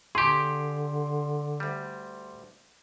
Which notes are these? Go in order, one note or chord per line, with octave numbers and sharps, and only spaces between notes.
D3 G4 G#4 C6 D6
D2 G3